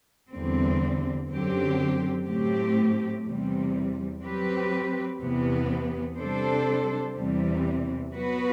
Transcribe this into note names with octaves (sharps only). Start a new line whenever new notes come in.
E2 D3 G3 C4
F#2 D3 F#3 C4 G4
A2 F#3 A3 C4 G4
E2 C3 G3
F#3 C4 G4 B4
E2 C3 E3 B3
C3 G3 D4 A4 C5
E2 C3 E3 G3
F#3 B3 F#4 B4